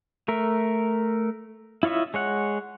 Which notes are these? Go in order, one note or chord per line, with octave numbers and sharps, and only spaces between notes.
A3 A#4 E5
E4 F4 C#5 D#5 E5
G#3 C#5 F#5